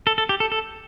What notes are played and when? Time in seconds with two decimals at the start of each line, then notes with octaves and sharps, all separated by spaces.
0.07 A4
0.18 A4
0.29 G4
0.40 A4
0.52 A4